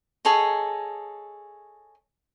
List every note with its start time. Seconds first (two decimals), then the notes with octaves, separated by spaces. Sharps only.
0.25 G#4 A4 C#5 D#5